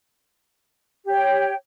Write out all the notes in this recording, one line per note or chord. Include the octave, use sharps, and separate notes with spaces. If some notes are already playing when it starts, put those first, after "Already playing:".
G4 C#5 G5